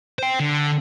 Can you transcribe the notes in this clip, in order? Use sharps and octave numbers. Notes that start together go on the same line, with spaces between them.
C5 G5
D3